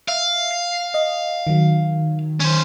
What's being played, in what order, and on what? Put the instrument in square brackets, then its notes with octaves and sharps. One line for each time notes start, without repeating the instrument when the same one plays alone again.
[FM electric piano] E5 [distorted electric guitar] F5
[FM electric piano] C7
D#5
D#3 F#3
[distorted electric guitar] C#4 C5